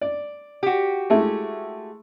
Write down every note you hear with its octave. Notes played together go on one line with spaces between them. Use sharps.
D5
F#4 G4
G#3 A3 E4